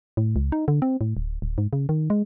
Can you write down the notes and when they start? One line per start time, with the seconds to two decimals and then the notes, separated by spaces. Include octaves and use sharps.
0.17 A2
0.36 C#2
0.52 D#4
0.68 D3
0.82 C4
1.01 A2
1.17 D1
1.42 D1
1.58 G#2
1.73 C#3
1.89 D#3
2.10 G#3